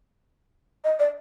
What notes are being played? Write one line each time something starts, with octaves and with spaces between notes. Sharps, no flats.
D#5
D5